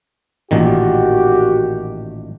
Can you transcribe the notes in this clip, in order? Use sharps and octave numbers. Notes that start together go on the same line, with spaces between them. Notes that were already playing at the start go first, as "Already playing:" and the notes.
A1 A#2 D#3 F#4 G4